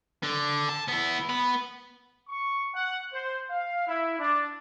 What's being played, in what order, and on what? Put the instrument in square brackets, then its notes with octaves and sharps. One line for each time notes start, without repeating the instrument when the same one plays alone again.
[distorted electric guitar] D3
A5
B3 E4
B3 B5
[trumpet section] C#6
F#5
C5
F5
E4
D4